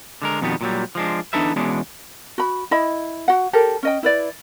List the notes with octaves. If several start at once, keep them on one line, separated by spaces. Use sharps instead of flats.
D3 G#3 A#4
F2 B2 D#3 G3 B3
A#2 F#3 G3
F3 G#3 D4
E2 D4 D#4 A4 B4 E5
E2 B2 G#3 C#4 D4
F#4 B5
E4 D#5 B5
F#4 F#5
G4 A4 A#4
C#4 D#5 G5
E4 B4 D5